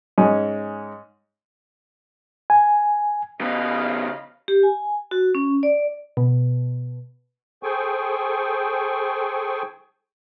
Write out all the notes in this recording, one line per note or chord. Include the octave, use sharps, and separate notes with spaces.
G#2 G#3 C#4
G#5
C#3 B3 D#5 F5 B5
G4
G#5
F#4
C#4
D5
B2
G#4 A4 C5 G5 G#5 C#6